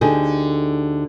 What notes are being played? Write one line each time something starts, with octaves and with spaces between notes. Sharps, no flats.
D2 D3 D#4 G4 G#4